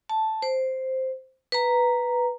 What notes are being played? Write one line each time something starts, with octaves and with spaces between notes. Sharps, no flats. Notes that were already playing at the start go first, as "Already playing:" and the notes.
A5
C5
B4 A#5